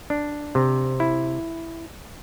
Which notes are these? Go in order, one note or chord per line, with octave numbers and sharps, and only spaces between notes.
D4
C3
E4